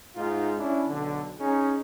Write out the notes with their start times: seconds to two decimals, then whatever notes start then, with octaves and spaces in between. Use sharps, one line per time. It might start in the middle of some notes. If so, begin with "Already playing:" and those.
0.16 G#2 D#4 F4
0.58 C#4 D4 E4
0.89 B1 D3
1.40 C#4 D#4 G#4